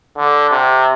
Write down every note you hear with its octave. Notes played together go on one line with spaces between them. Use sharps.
D3
C3